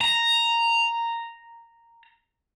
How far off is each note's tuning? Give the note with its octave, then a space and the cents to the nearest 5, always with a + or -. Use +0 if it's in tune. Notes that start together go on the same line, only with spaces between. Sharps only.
A#5 -5